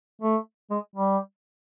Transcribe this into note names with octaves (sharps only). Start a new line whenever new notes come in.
A3
G#3
G3